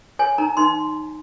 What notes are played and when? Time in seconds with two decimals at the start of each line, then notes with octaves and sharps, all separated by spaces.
0.19 C#5 G#5
0.38 D#4 A#5
0.57 D#4 C6